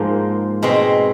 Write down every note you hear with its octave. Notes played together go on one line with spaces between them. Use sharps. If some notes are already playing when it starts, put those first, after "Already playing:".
Already playing: G#2 F3 A#3
B2 G#3 C4